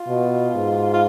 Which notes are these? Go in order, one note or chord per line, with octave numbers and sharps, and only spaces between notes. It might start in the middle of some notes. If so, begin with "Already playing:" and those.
Already playing: F4
B2
G#2
F4